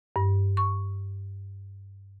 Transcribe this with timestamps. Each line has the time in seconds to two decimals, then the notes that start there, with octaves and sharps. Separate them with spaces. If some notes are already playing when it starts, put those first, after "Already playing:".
0.16 G2
0.57 C#6